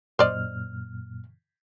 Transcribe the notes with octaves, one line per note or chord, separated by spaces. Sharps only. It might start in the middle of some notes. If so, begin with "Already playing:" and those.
F#2 A#2 C5 D5 D#5 F6